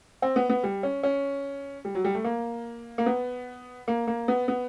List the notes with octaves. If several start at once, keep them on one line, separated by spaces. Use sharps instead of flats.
C4
B3
B3
G3
C#4
C#4
G3
F#3
G3
A3
A#3
A#3
B3
A#3
A#3
B3
B3